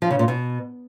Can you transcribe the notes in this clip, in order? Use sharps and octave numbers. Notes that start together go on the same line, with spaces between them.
F3
C#3
A#2
B2